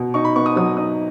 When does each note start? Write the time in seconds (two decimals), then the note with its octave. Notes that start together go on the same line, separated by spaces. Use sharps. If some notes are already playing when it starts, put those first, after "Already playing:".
Already playing: B2
0.14 D#4 C#6
0.25 B5
0.36 B3 C#6
0.46 D#6
0.56 F#3 D#6
0.77 D#4 D#6